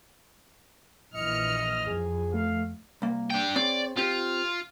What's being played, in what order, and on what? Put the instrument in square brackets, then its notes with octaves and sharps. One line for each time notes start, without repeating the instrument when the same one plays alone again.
[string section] A#1 E3 F6 [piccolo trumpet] D#5 [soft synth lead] C#7
[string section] F2 [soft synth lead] G#4
[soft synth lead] A3 [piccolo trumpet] F5
[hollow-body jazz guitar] C2 A#3
[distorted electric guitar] D4 G5
[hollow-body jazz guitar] C4 G#4 C#5 [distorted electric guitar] D5
[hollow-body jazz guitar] C4 G4 [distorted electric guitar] F4